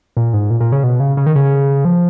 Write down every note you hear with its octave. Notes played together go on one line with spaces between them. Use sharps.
A#2
G#2
A#2
A#2
C#3
B2
C#3
C#3
D#3
C#3
F3